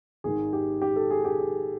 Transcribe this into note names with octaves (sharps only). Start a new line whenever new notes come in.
G#1 G#2 D#3 G#3 G#4
G4
G4
A4
G#4
G4
G#4